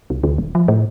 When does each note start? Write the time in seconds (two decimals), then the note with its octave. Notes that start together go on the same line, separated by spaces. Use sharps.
0.10 C2
0.24 D2
0.38 E1
0.55 F3
0.68 A2